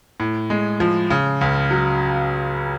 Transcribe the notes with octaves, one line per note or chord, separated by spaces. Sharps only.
A2
G#3
F3
C#3
C#2
F#3